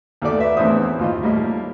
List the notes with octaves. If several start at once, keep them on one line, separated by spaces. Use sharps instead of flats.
D#2 A3 F#4 D5 D6
B4 E5
A#1 E2 A2 C4 C5 D#6
D#2 F4 D#5
A2 G3 A#3 D#5